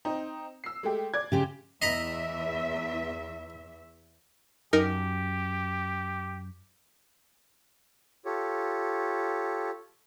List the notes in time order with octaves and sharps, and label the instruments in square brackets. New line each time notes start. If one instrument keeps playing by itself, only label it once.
[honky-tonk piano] C4 D#4
E6 C7
G#3 A3 G4
D5 G#6
[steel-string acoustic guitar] C#3 G4 C5
[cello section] E2 E5 [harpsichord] D#5 A#5 B5
[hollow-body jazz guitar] F#2 [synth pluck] D#4 A#4 [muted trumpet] G4
[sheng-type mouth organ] F4 G4 A4 C#5